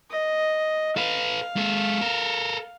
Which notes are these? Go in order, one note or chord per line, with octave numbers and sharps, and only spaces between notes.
D#5
A4 B4 F5
G#3 A4
A4 A#4